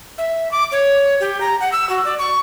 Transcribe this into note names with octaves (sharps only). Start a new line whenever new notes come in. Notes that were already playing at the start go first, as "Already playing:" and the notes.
E5
D6
C#5
G4
A#5
F#5
E6
F#4
D5
C#6